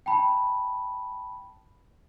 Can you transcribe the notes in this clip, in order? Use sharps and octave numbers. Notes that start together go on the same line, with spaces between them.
G5 A5 B5